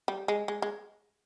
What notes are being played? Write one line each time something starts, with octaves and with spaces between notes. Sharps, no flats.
G3
G#3
G#3
G#3